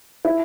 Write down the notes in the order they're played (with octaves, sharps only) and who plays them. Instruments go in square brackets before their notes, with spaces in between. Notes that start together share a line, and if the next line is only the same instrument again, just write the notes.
[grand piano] E4